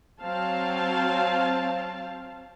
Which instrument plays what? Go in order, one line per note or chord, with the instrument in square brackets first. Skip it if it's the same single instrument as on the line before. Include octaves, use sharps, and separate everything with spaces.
[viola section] F#3 C4 F5 A5